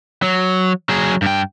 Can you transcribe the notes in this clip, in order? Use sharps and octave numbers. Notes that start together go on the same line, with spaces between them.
F#3
F#3 G#4
G2 G5